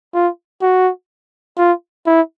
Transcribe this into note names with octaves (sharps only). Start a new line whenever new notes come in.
F4
F#4
F4
E4